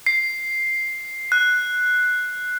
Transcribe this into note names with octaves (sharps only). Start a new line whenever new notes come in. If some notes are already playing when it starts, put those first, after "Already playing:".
C7
F#6